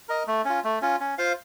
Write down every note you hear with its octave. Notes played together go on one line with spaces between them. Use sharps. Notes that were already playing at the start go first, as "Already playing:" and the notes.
A#4 D#5
A3
C#4 F4
A3
C#4 F4
C#4
F4 C5 F5